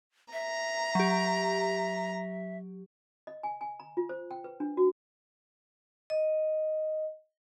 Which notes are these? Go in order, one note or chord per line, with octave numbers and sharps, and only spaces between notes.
E5 A#5
F#3 G4
D#5
G#5
G#5
A#5
F4
C5
G5
B4
D4
F#4
D#5